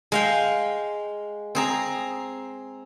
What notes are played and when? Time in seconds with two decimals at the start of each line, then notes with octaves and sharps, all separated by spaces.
0.12 G#3 F5 G5
1.55 C4 G#4 A#5